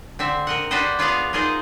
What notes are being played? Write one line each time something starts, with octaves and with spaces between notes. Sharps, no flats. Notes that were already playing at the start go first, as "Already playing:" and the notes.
D3 C4 E5
A#4 D#5 F#5
D4 F#4 G4 B4 C5 D#5
B3 F4 G#4 D5 D#5 F5
D#4 F4 G#4 A#4 C5 D#5